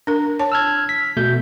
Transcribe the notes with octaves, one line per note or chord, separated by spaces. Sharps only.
D4 A#4
C#5 A5
E6 F6 G#6
B6
B2 A3 G6